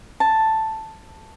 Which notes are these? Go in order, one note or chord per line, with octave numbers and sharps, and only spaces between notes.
A5